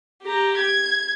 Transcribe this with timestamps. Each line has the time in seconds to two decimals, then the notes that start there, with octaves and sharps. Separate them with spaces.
0.23 G4 A#5
0.58 G#6